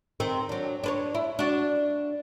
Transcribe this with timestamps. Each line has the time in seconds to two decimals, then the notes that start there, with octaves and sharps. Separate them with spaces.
0.20 D#3 C4
0.49 F#3 D4
0.84 D4 B4 C#5
1.14 E4
1.39 D4 F#4